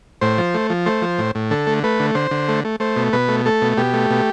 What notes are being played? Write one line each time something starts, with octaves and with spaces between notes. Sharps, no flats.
A2 C5
F3
A3
F3
A3 C5
F3
A2
A2
D3 A4
A3
A3 B4
D3
D3 C5
D3
A3
A3
A3 C5
B2
B2 B4
A3
A3 A4
B2
B2 G4
A3
B2